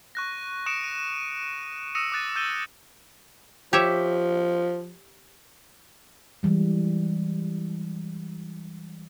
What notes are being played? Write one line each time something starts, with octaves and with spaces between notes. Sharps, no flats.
C#6 F#6 A#6
C#6 D#6 C#7 D7 E7
D#7
D#6 E6 A#6 C#7 D#7 E7
D6 D#6 F#6 A6 D#7
E6 G6 A6 D#7 G7
F3 G4 C#5 E5
E3 G3 G#3